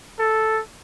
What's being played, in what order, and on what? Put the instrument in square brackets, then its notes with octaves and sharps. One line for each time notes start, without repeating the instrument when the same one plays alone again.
[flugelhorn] A4